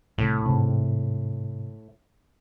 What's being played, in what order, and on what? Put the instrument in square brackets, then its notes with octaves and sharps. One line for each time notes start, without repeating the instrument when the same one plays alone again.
[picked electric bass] C2 [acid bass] A2
[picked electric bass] G#2 C3